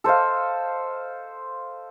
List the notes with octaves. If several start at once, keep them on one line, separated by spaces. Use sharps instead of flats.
A4 C5 D#5 F5